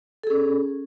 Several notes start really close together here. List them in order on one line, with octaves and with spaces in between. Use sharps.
A4 G#4 C#4